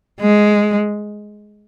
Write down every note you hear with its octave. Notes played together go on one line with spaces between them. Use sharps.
G#3